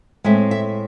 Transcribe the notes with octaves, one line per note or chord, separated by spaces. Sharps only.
A2 G#3 C4 E5
E5